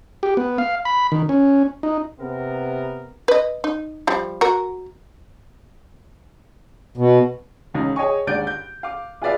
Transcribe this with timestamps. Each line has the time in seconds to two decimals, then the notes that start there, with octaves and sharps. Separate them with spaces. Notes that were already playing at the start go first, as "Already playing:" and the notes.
0.23 G4
0.37 B3
0.58 F5
0.85 B5
1.12 D#3
1.29 C#4
1.83 D#4
2.20 C3 B3 A#4
3.28 B4 D#5
3.64 D#4
4.07 F3 G3
4.41 F#4 A#4
6.97 B2
7.74 E1 C#2 D#4
7.96 G#4 C#5 D#5 G5 G#5 C#6
8.27 D#2 G#2 D4 D5 G6 D7
8.47 G6
8.83 F5 D6
9.22 F4 G#4 B4 D5 E5 F5